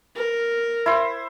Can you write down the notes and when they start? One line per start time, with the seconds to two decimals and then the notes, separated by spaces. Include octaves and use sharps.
0.16 A#4
0.86 E4 C5